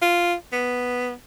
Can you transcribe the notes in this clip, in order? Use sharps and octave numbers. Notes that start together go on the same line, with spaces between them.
F4
B3